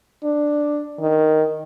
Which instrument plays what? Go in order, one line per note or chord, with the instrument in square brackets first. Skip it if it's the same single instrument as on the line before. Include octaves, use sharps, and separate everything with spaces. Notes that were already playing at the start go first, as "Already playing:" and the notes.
[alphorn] D4
D#3